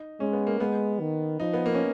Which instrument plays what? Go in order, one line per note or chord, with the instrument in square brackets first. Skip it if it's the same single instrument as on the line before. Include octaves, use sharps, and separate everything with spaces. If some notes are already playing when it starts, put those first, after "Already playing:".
Already playing: [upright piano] D#4
[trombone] G#3 [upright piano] C#4
[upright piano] B3
A#3
[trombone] G#3 [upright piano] B3
[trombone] D#3
[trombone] F3 [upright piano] D#4
[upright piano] B3
A#3
C#4